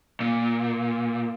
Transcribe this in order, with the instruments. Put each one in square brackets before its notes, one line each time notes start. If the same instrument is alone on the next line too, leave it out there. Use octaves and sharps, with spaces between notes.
[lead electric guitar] A#2